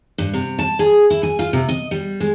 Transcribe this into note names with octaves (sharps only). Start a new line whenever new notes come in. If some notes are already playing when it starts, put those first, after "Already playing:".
G2
C3
A5
G#4
E4
G#5
F4
C3
D#5
G3
G#3